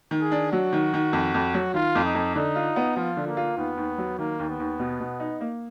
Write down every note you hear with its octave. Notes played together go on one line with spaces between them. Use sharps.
D#3
G#4
D4
F#3 F#4
D#3
D#3
F2
F2
F#3
D#3 F4
F2
D#4
F2
D3 D#4
F4
B3
F3 F4
D3
A#3
F4
D#2 B3
D#2
F#3
D#3 A#3
D#2
B3
D#2
B2
B2
D#4
A#3